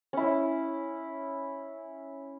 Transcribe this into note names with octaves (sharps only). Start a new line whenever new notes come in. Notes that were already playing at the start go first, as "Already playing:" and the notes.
C#4 E4